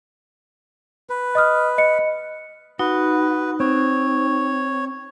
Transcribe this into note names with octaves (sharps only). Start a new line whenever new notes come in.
B4
D#5 D#6 F6
D#5 C#7
D#4 F#4 B4
C4 C#5